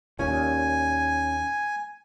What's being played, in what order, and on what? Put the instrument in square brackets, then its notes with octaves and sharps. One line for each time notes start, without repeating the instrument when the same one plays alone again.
[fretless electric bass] D#2 A#2 [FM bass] C#4 [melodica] G#5